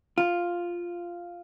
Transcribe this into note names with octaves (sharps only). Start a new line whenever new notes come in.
F4